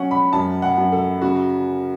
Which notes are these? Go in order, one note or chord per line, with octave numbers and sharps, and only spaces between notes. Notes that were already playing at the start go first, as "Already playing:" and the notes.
Already playing: F#3 C#4 F#5
B5
F#2 A5
F#5
F#2
A4
C#3 F#4